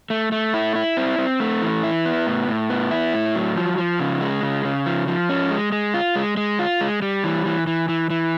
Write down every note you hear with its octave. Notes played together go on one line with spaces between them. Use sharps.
A3
A3
E4
E4
C4
C4
A3
E3
E4
B3
A2
A2
B3
E4
A2
F#3
F3
F3
C#3
G#3
C#3
C#3
F3
F3
C#4
G#3
G#3
F4
G#3
G#3
F4
G#3
G3
E3
E3
E3
E3
E3